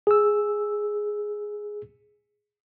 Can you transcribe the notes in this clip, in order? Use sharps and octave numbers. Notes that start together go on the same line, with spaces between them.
G#4 E6